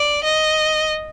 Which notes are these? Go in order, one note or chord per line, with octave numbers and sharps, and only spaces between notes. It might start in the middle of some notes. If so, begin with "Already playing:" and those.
Already playing: D5
D#5